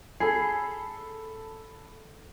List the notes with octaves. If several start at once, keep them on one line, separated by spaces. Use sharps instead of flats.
G#4 A4 B5 C7